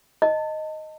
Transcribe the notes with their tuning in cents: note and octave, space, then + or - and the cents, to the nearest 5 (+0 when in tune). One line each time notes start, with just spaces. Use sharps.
D#5 +0 A5 +30